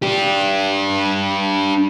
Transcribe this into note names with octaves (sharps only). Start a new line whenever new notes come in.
D4 G4